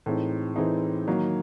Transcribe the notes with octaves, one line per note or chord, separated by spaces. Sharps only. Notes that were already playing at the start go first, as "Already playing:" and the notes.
A2 E3 G#3 C4 D#4
A2 E3 G#3 C4 D#4
D#3 F#3 A#3 D#4